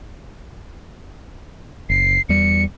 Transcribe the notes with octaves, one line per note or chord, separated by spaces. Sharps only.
F#1 C7
E2 G3 C#7